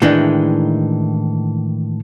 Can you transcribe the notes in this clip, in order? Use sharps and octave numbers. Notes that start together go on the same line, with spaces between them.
A2 D#3 E3 G#3 D4 D#4